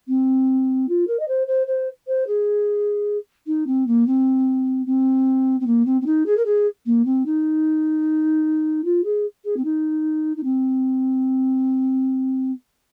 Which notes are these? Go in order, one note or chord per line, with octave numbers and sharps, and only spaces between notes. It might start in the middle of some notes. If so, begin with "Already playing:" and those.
C4
F4
A#4
D#5
C5
C5
C5
C5
G#4
D#4
C4
A#3
C4
C4
C4
A#3
C4
C4
D#4
G#4
A#4
G#4
A#3
C4
D#4
F4
G#4
G#4
C4
D#4
D#4
C4